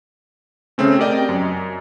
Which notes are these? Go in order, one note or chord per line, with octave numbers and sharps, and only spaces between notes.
C#3 A3 C4 C#4
G4 A#4 D5 D#5 G5
F#2